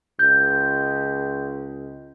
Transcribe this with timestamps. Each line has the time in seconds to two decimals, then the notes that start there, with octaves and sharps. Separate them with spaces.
0.19 C#2 G6